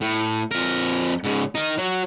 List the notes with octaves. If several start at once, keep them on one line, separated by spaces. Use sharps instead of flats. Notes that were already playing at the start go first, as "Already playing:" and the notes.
A2
F2 A#4
G#2 C#3
D#4 A#4
F#3